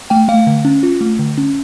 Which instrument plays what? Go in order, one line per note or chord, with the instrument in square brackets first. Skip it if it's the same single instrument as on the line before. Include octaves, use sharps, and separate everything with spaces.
[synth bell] A3 G5
A3 F5
D3
C#4
F4
A3
D3
C#4